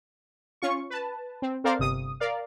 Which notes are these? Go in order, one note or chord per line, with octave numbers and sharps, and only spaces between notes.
C#4 F4 C#6
B4 A5
C4
C4 A4 A#4 C5 D5 F5
G1 C3 D#6
A#4 D5 F5